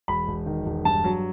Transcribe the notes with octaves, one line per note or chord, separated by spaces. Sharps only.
E1 B5
E1
D#3
E1
G2 A5
F#3